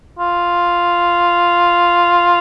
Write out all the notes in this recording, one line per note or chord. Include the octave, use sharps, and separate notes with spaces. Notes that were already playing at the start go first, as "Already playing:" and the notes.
F4